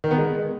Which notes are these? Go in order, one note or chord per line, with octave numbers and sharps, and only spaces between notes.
D#3
B3
G#3